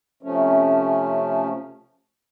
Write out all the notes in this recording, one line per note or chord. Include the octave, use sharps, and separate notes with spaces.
C3 F3 A3 C#4